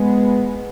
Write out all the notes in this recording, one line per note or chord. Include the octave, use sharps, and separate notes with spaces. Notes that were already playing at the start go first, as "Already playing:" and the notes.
Already playing: G#3 B3